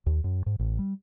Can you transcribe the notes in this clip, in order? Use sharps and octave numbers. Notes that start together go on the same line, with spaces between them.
D#2
F#2
G#2
A1
G3